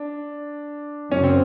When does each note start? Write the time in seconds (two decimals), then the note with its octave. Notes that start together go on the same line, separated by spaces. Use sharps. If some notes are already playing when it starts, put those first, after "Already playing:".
Already playing: D4
1.12 F#2 C#3 C#4
1.24 C4